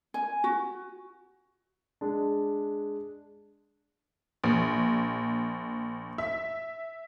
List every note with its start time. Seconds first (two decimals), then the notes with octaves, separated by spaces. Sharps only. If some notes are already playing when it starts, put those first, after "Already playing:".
0.14 G#5
0.44 F#4
2.01 G#3 D4
4.44 A#1
6.18 E5